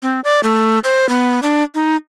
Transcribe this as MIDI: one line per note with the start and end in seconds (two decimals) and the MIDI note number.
0.03 0.20 60
0.24 0.40 74
0.43 0.79 57
0.84 1.08 72
1.09 1.40 59
1.43 1.63 62
1.75 1.96 63